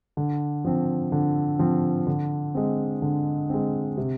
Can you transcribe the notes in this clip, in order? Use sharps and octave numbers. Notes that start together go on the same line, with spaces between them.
D3
F3 C4
D3
F3 C4
D3
G#3 C4
D3
G#3 C4
C3